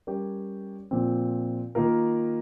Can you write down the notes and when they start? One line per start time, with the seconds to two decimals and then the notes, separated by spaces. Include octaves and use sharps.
0.07 G3 C#4 G4 A#4 C#5
0.91 A#2 F3 C4
1.75 D#3 A#3 F4 A#4